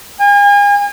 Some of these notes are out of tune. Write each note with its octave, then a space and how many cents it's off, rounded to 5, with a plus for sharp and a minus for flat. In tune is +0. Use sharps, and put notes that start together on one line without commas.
G#5 -40